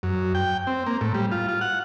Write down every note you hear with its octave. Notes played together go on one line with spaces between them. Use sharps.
F#2
G5
C4
A#3
A2
G3
F4
F4
F#5